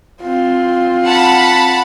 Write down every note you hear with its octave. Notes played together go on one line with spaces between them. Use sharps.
C4 F4
F#5 A5 B5